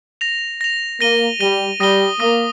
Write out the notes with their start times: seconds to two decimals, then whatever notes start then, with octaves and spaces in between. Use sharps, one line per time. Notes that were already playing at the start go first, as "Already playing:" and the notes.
0.21 A#6 F7
0.61 A#6 F7
1.01 A#3 A#6 D#7 G7
1.40 G3 A#6 D#7 G7
1.80 G3 D#6 A#6 D#7 G7
2.20 A#3 D#6 A#6 D#7 G7